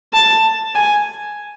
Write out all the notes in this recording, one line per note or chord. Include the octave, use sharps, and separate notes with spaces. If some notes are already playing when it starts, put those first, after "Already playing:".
A5
G#5